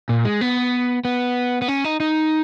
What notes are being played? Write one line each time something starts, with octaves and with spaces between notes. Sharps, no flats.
A#2
G#3
B3
B3
B3
C#4
D#4
D#4